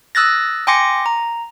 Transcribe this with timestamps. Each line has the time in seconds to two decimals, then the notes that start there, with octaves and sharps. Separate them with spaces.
0.15 D#6 E6 F#6 A6 A#6
0.67 G5 G#5 C6 D6 A#6 C#7
1.06 A#5